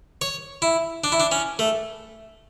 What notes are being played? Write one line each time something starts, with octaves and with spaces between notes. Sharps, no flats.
C#5
E4
D4
E4
D4
C#4
A3